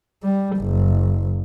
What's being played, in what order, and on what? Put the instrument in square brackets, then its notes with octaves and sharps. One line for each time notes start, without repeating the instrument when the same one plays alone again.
[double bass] G3
F#1